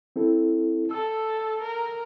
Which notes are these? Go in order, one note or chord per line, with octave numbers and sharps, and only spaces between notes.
C4 E4 A4
A4 E6
A#4